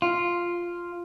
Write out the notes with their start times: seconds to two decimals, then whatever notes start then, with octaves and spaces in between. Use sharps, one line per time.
0.02 F4